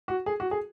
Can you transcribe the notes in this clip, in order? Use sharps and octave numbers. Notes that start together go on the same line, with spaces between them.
F#4
G#4
F#4
G#4